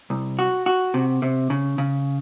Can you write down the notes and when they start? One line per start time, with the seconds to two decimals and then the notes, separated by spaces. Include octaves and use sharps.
0.10 C2
0.39 F#4
0.66 F#4
0.94 C3
1.22 C3
1.50 C#3
1.78 C#3